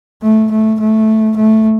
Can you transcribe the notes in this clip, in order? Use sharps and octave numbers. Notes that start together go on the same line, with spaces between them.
A3
A3
A3
A3